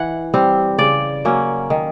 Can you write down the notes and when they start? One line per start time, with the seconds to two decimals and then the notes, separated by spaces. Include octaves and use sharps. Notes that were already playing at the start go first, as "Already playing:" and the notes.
Already playing: E3 F#5
0.34 G3 C4
0.79 C#3 D5
1.25 F#3 A#3 C#4
1.70 D#3